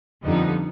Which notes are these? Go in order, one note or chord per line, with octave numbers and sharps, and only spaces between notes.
F2 D3 G3 B3 D#4